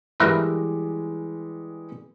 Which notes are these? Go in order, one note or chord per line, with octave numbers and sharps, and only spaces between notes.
E3 G3 G#3 A#4 B4 E5